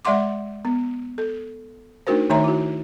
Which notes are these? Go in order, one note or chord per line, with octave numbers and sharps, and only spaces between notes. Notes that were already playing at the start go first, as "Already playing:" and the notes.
G#3 D5 E5 F#5 C6 D6
B3
A4
A3 D4 D#4 F#4 A#4 C5
D#3 A3 D#4 C#5 E5 A#5
E4 F#4